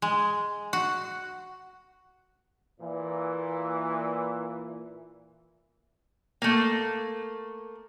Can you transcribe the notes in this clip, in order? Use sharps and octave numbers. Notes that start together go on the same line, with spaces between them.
G#3
F#4
A#2 E3
A3 A#3